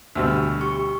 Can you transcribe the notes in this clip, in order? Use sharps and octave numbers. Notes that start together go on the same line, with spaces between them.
D2 B2 G3 E6 F6
G4 C#6